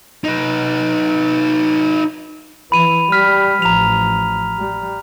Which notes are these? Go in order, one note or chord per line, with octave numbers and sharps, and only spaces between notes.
D#4 B4
E3 B5 D#7 F7
G3 F6 B6
A1 F3 A#5 F7
G3